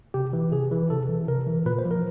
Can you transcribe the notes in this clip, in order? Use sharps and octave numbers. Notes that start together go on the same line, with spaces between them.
C3 G4
E3
C3 G#4
E3
C3 A4
E3
C3 A#4
E3
A#2 B4
C5
F3
A#4